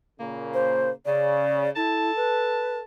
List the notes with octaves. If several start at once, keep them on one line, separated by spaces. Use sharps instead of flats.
A#2 C#3 A#3
C5
C#3 D5
E4 A4 A5
B4